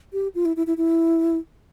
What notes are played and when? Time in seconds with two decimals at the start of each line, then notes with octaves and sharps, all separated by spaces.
0.13 G4
0.35 F4
0.45 E4
0.56 E4
0.67 E4
0.77 E4